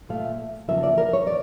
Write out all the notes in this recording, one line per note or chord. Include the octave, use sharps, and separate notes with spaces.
A#2 A3 F5
E2 C#3 F3 A#3 E5
D5
A#4
C#5
D5